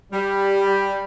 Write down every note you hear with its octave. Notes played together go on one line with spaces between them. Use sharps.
G3